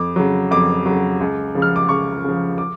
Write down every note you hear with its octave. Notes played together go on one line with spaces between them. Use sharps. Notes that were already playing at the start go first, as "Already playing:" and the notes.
Already playing: F2 D6
C#3 F#3
F2 D6
C#3 F#3
C#2
C#3 F3
F6
D6
C#2 C#6
C#3 F3
D6